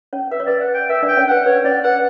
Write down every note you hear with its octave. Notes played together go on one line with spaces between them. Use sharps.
C#4 C#5
B4 E5
C#5
B4 D5
F#5
G5
B4 E5
D4 D5
G5
C#4 C#5
B4 F#5
B4 C#5
C#4 C#5 D5
B4 F#5